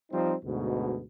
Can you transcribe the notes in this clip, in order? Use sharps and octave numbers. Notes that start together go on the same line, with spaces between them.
F3 G3 C4 D#4
D2 G#2 B2